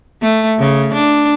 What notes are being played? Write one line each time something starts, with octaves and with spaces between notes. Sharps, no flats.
A3
C#3
D4